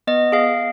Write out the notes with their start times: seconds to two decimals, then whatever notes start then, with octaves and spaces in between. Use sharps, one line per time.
0.07 B3 D#5
0.32 G#4 F5